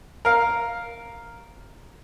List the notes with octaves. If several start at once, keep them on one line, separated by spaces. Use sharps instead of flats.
A#4 F5